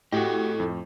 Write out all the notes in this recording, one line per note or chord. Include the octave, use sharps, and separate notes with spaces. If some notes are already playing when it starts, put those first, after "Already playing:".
A2 F#4 G4 A4 D#5
F2